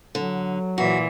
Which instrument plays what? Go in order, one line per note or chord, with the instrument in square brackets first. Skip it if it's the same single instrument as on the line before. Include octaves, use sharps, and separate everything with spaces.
[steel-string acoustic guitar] D3 [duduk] F#3
[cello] A#2 E3 [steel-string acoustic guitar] F#4